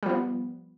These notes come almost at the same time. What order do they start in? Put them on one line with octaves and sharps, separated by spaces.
G3 F3 B3